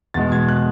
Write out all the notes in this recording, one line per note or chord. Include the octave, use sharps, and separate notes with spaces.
E2 B2 G#3 A6
G#6
F#6